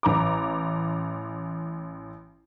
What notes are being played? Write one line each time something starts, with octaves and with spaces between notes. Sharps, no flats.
A1 A#5 D6